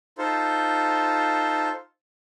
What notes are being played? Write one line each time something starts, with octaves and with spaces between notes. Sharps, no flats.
D#4 F4 A4 C5